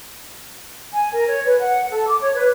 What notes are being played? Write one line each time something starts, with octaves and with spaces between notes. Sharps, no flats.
G#5
A#4
C#5
B4
F#5
A4
D6
C#5
B4